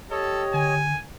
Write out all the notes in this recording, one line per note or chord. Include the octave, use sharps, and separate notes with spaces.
G4 A4 C#5 D#5
D3 G#5